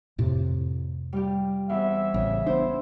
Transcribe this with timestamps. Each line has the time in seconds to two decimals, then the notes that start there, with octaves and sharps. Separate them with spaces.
0.18 F2 A2 C3
1.13 G3 F4 G4
1.69 E2 C4 E5
2.14 A1 C#3
2.46 B3 D4 E4 C5